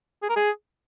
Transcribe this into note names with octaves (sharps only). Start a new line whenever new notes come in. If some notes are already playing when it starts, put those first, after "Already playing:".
G#4
A#4
G#4